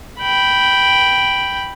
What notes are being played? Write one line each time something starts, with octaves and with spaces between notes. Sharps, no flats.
G5 B5